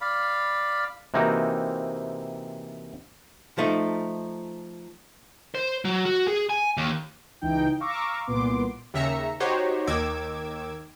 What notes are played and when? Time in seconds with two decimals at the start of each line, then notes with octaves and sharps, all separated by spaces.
0.01 D5 F5 B5
1.14 C3 E3 A#3 C4 D#4 F#4
3.58 F3 A3 D#4
5.55 C5
5.85 F#3
6.05 F#4
6.28 G#4
6.49 G#5
6.77 D#2
7.41 C#2 E3 D#4 G5
7.80 F5 A#5 C#6 D6 E6
8.26 C2 A#2 B3 C6 D6
8.94 D#2 C#3 E5 A#5 C#7
9.40 D#4 F#4 G4 C5 C#5
9.87 D#2 D#3 D6 E6 G#6